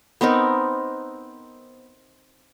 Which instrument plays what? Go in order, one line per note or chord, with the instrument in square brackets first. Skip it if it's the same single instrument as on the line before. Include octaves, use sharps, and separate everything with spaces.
[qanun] B3 C4 D#4 A#4